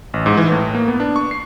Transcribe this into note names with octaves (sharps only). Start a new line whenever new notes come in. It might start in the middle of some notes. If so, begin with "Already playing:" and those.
A1
G#2
E3
A2
A#3
B3
D4
C#6
C7